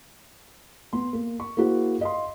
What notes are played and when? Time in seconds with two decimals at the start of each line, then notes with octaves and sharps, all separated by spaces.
0.93 B3 C6
1.13 A#3
1.40 C#6
1.57 A#3 E4 F#4 G#4 C5
2.01 D#5 F5 C6